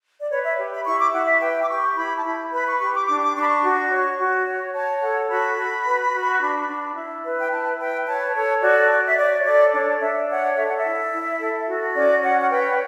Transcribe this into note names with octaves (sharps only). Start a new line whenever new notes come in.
D5
B4 C#5
E5
G4
B5
E4 C#6
D6
E4 F#5
E5
B4 G5
D6
G4 C#6
E4 B5
A5
E4 B5
B4 B5
C#6
G4 C#6
D6
D4 D6
D6
D4 C#6
B5
C#6
F#4
C#5
F#4
C#5
C#5 A5
A4 F#5
F#4 B5
F#4
B4
F#4
D4
D4
E4
B4
G5
E4 A5
B4 G5
C#5 A5
A4 C#5
F#4 D5
F#4
E5
C#5 D5
C#5
A4 D5
D4 C#5
D4 E5
C#5 F#5
A4 E5
F#5
E5
E4
E4
A4
F#4
C#4 D5
C#5 F#5
F#5
B4 G5